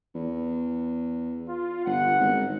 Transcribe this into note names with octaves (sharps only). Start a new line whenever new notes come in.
E2
F4
G1 F#5
G#1